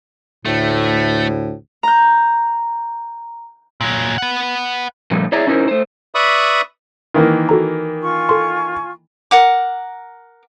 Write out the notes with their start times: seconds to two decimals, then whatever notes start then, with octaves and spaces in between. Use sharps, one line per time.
0.45 D2 A2 A3
1.83 A#5 G6
3.81 A#2 F#3
4.18 B4 F#5
5.11 A#2 D3 F3 G3 A3
5.32 E4 G#4 C#5 D5 E5 A#5
5.47 C#4 D#4 E4 A#4 C5
5.68 A3 C5
6.15 B4 D5 E5 B5 C#6 D#6
7.14 D#3 E3 A#3
7.49 F#4 A4 A#5
8.02 F4 G#5 C#6
8.29 A4 C6
9.31 A#4 F#5 D6